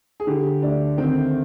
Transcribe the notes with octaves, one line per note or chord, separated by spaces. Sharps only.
G#4
D3 G4
D2 D4
D#3 C4